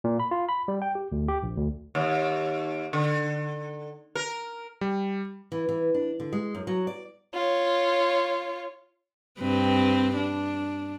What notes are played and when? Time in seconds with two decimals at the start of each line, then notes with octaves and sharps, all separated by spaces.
0.04 A#2
0.20 B5
0.31 F4
0.49 B5
0.68 G3
0.82 G5
0.95 G4
1.12 D2
1.28 G4
1.43 A#1
1.57 D2
1.95 D#2
2.93 D3
4.15 A#4
4.81 G3
5.52 E3
5.69 E3
5.94 D4
6.20 D3
6.33 G#3
6.54 F#2
6.67 F#3
6.87 D5
7.34 F4 C#5
9.40 G2 C4 B4
10.16 D4